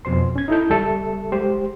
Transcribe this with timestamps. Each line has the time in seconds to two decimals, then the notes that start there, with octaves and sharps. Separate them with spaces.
0.05 F2 B2 C5 C6
0.36 C#4 G#6
0.48 D#4 E4 A4 G6
0.69 C#2 G3 A4 E5
1.32 G#3 G4 C5